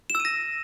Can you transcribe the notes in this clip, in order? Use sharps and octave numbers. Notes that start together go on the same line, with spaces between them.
E7
E6
D#7
A#6